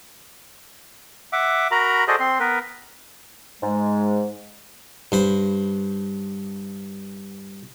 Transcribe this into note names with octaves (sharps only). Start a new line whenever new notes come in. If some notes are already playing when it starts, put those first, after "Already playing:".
E5 F#5 D6
F#4 A#4 A#5 B5
F#4 G#4 A4 C5 D5 D#5
C4 C6
B3 A#4 B4
G#2 G#3
G2 C5 B5